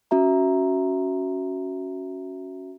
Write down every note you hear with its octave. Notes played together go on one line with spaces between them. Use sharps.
C#4 F#4 E5 A#5